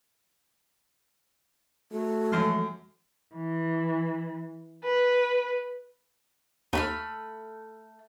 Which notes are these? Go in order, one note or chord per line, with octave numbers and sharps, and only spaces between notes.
A3 F#4
F#2 E3 F3 G#3 C6 F6
E3
B4
D#2 A3 B5 F6